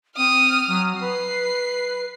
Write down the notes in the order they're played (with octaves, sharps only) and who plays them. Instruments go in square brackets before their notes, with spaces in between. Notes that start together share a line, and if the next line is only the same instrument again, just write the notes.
[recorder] C4 [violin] D#6 F6
[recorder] F#3
[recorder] B4 [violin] C7